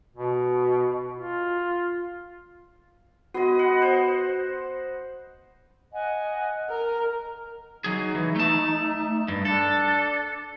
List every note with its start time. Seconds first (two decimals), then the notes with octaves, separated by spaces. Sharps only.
0.16 B2
1.17 F4
3.34 B3 F#4 D#5
3.59 F#5
3.82 C5
5.92 D#5 F#5 G#5
6.69 A#4 A#5 F6
7.84 F#3 D#4 G#4
8.15 E3
8.36 A3 A5
9.28 G2
9.45 D4 A4